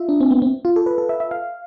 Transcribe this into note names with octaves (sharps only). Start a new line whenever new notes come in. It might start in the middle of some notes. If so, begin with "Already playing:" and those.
Already playing: F4 E5
D4
C4
B3
C4
F4
A4
B4
A4
E5
E5
F5